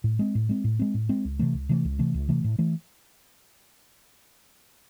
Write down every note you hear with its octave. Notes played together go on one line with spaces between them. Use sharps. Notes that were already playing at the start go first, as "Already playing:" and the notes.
A2
G#3 C4
A2
G#3 C4
A2
G#3 C4
A2
G#3 C4
C#2
C3 E3 A3
C#2
C3 E3 A3
C#2
C3 E3 A3
C#2
C3 E3 A3
A2
E3 A3